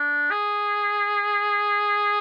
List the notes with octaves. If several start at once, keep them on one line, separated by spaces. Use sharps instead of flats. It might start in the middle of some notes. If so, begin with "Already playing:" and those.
Already playing: D4
G#4